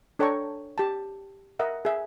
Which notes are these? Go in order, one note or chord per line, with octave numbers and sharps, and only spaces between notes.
D4 A4 C#5 G5 A#5 C#6
G4 A5
A#4 D#5 E5 F#5
G#4 E5